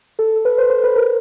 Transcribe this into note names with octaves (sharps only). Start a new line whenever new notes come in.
A4
B4
C5
C5
B4
A#4